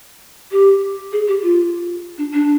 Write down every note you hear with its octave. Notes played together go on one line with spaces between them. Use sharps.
G4
G#4
G4
F4
D4
D4